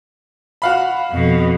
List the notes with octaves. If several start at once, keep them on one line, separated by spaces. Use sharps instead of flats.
F#4 F5 B5
F2 B2